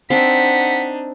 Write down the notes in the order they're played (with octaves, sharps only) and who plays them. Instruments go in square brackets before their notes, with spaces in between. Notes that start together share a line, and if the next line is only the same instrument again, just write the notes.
[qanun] C4 [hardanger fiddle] D4 D#4 [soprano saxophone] F#5 [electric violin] B6